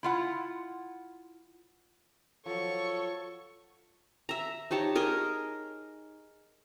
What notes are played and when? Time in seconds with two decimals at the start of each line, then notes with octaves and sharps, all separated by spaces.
0.03 E4 F4 F#5
2.46 F3 F#3 A4 C#5 C#6
4.29 E5 A#5
4.71 D#4 G4 C#5 A5
4.95 G#4 A#4 D#5